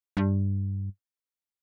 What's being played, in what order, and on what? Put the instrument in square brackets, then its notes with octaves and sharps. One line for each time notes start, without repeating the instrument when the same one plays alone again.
[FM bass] G2